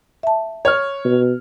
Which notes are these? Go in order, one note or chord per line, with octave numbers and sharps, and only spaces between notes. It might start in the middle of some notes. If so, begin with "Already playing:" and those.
E5 A5
C#5 F6
B2